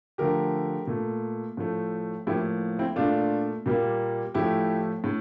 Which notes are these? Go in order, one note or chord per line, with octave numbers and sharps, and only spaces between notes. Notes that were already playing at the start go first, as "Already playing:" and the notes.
D3 F3 A3 G4 A#4
A#2 A3
A2 F3 A3
A2 F3 A#3 E4 G4
C4 E4
A#2 A3 D4 F4
A#2 G3 A#3
A2 F3 A3 E4 G4
A2